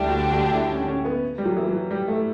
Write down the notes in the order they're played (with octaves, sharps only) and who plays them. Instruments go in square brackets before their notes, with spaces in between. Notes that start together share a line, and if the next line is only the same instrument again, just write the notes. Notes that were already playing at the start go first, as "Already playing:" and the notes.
Already playing: [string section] D2 D3 G3 D4 G4 [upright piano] E4
[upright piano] F#4
F#4
E4
C#4
C#4
B3
G3
F#3
E3
F#3
G3
A3